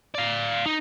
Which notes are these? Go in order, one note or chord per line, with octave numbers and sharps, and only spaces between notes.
D5 F5
D#4